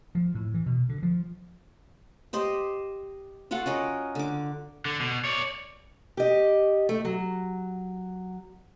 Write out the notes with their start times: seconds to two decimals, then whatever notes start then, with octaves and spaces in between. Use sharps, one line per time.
0.15 F3
0.35 A2
0.54 E3
0.66 B2
0.89 D3
1.03 F3
2.33 G4 C5 D#5
3.51 F4 F#4 A4 F#5
3.66 C#4 A#4 D#5
4.15 D3 D6
4.85 D3
5.00 B2
5.25 C#5 D5
6.17 G4 D#5
6.89 A3
7.05 F#3